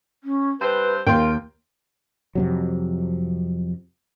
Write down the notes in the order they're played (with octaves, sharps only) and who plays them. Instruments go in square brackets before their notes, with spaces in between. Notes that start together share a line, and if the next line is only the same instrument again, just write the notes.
[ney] C#4
[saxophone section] G2 C4 C5 [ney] B4
[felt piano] D#2 [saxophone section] F4 [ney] A#4 [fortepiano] G5 C6
[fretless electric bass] F2 C3 F#3